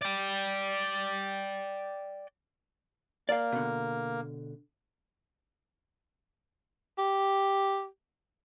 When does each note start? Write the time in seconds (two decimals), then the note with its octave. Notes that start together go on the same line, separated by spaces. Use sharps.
0.02 D5 G5
3.29 A#3 D5 F5
3.52 B2 D3
6.98 G4